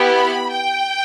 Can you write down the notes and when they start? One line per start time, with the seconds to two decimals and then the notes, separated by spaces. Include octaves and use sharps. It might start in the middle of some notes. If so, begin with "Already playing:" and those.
Already playing: B3 E4 G4
0.15 B5
0.51 G5